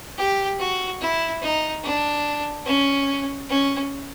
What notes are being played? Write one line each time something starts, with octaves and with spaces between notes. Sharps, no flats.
G4
F#4
E4
D#4
D4
C#4
C#4